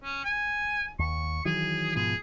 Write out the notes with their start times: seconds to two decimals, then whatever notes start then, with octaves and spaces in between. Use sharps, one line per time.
0.04 C#4
0.24 G#5
0.99 D#2 C#6
1.45 D#3 E3 F#3 G#4
1.95 G#2 B2 F3 G#4